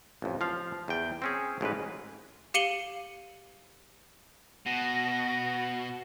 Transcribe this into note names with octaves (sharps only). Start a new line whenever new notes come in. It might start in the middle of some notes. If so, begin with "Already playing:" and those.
A1 F2
F3 F5
E2 G5
C4 C#4 G#4
A1 G#2 A#4 B4
G4 F5 C#7 D#7 F#7 G7
B2 F#5 A#6